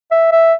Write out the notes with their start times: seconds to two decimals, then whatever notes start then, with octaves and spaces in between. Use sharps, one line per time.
0.12 E5
0.32 E5